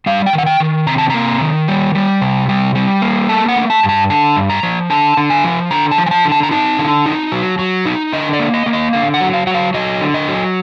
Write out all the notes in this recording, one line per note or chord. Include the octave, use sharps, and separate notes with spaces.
G3 F5
G5
D#3
F#5
G5
D#3
C3 A#5
A5
A#3 A#5
D#3
G3
G3
C3
G3
G3
A#3
A3 A5
F#5
A3
A5
G2
A5
D3 A5
G2
A#5
F3
D3 A5
D3
G#5
F3
D3 A#5
A5
F3
G#5
A5
D3
A5
A#5
D#4 A5
D3
D#4
F#3
F#3
D#4
D3 D#5
D5
A#3
D#5
A#3
D#5
D3 F5
F#5
F#3
F5
F#3 F#5
F5
F#3 D#5
D3
D#5
F#3